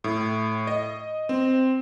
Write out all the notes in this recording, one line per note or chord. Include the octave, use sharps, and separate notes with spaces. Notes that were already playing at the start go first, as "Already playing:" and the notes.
A2
D#5
C4